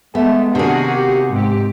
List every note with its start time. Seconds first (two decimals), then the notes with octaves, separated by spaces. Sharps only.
0.15 G#3 A3 B3
0.55 C3 D#3 A#3 D4 F#4 G#4 F#5
0.94 G4
1.31 G#2 C4 G4